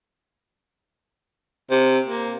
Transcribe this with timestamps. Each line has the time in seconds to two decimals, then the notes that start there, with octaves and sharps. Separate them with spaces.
1.71 C3
2.06 A#3